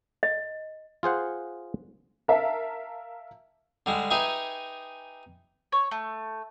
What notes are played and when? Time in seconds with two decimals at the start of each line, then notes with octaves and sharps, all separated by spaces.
0.23 D#5
1.03 F4 G#4 C5 F#5
2.28 A#4 E5 F5 A5
3.86 D3 G3 G#3
4.10 D#4 G4 G#4 B4 E5 G#5
5.72 C#5
5.91 A3